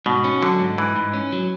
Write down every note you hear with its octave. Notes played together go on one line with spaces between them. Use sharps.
G#2 B2
C#4
D3 F#3
G#2
G#2 E3
G#2
C#4
F#3